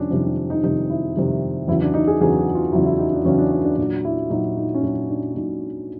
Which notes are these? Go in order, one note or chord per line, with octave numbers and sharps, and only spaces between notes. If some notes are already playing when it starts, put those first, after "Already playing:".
Already playing: F2 C3 D#3 G3 C#4 D4
F2 C3 D#3 G3
D4
D#4
F2 C3 D#3 G3 D#4
E4
F2 C3 D#3 G3
E2 C#3 F#3 E4
D4
D#4
G#4
E2 C#3 F#3 G#4
F#4
F4
E2 C#3 F#3 E4
E4
D#4
D4
E2 C#3 F#3 C#4
D4
D4
D4
A#2 F#3 D4
E4
A#2 F#3 D#4
D#4
C#4
A#2 F#3 D4
D4
A#2 F#3 D#4